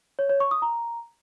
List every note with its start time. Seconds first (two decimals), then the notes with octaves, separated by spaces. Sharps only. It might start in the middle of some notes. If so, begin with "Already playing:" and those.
0.19 C#5
0.30 C#5
0.40 C#6
0.51 D#6
0.62 A#5